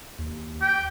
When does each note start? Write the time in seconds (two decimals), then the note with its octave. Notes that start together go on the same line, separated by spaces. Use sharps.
0.18 D#2
0.62 G5